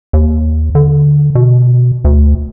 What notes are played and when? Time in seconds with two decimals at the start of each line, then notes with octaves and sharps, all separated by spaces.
0.13 D#2
0.75 D3
1.35 B2
2.05 D2